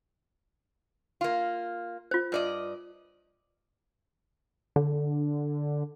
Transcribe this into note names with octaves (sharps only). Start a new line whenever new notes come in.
A#3 F4
F4 C5
G2 D5 D#5
D3